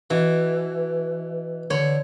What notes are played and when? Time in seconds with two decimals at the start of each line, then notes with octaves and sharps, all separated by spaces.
0.10 B2 E3
1.70 D3 C#5